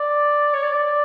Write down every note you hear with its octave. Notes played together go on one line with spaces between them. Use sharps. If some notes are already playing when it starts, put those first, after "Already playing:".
Already playing: D5
C#5
D5
D5